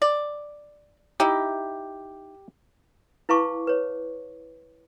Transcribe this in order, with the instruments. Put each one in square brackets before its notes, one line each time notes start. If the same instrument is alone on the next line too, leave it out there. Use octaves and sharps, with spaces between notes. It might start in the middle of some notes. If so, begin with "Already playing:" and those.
[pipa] D5
[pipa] D#4 E4 [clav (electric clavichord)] G4
[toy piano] E4 B4 F5 A5 C#6 D6
B4 C#5